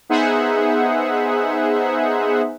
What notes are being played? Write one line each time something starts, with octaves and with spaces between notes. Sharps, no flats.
B3 D#4 G#4 C5 E5 F#5